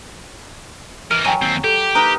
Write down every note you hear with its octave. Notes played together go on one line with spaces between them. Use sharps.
E3 A#4 F6 D#7
F#3 G5 G#5 D#7
D#2 C4
G4 A4
A#3 D#4 B4 A#5